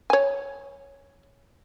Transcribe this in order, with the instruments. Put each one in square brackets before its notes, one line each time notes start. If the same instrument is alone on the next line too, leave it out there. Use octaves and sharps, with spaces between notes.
[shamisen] C#5 G#5